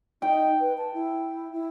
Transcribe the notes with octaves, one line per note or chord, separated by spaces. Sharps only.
D#4 G5
B4
A5
E4
E4